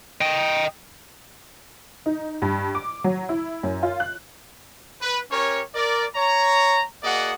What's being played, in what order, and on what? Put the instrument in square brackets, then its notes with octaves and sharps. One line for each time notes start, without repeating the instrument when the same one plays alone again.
[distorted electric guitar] D#5 G5
[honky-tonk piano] D#4
G2
D6
F#3
E4
F#2
F4
F#6
[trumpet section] B4
C#4 G4 A#4 C#5
A#4 D5
C#5 A#5
A#3 F#4 G#4 D5 D#5 F#5